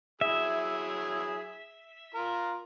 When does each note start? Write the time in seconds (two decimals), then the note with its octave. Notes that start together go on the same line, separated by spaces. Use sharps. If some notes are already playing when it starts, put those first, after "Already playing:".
0.21 F#3 E4 G#4 E5
2.15 F4 A#4